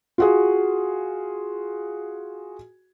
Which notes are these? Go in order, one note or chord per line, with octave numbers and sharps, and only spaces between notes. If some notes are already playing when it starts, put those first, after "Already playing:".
F4 F#4 G#4